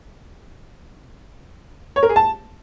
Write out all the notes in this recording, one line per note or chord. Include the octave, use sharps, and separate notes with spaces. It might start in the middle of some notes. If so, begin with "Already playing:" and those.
C#5
A#4
G#4
A5